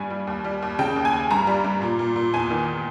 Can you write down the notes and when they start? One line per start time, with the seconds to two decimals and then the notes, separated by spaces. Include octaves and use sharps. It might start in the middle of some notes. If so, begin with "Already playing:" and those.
Already playing: G2 G3 G#5
0.10 G3
0.27 D#2
0.44 G3
0.62 D#2
0.79 C#3 G5
0.96 D#2
1.05 G#5
1.13 D#2
1.31 G2 A#5
1.47 G3
1.65 G2
1.82 A#2
1.99 A#2
2.16 A#2
2.34 E2 G#5
2.50 D#3